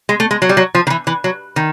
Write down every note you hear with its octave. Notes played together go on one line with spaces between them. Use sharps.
G#3
A3
G#3
F#3
G3
F#3
F3
D#3
E3
E3
F#3
D#3